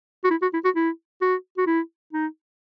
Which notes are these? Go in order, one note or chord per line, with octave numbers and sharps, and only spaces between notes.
F#4
E4
F#4
E4
F#4
E4
F#4
F#4
E4
D#4